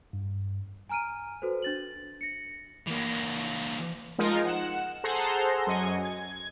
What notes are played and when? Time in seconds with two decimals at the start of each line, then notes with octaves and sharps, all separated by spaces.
0.13 G2
0.89 G#5 A#5 F6 D7 D#7
1.42 F#4 A4 B4 C5
1.62 D4 A6 F#7
2.21 A#6 C#7
2.87 E3 A#3
4.18 F3 G#3 D#4 F4 A#4
4.46 F#5 E7
5.04 G#4 A4 C5 F#5 A#5 C6
5.67 F#2 D#5 G#5 C#7
6.05 G#6